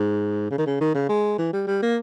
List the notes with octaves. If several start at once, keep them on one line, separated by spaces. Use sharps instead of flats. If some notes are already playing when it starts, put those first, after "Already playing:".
Already playing: G#2
C#3
D#3
C#3
D#3
C#3
G#3
E3
G3
G3
A#3